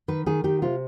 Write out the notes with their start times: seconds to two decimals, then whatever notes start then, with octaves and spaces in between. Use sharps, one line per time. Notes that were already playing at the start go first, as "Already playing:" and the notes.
0.08 D#3 B4
0.26 D#3 G#4
0.44 D#3 G4
0.62 C3 F4